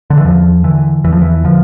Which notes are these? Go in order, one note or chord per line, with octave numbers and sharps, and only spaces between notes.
D3
E3
E2 F3
D3 E3
E2 E3
F3
E3
D3 F3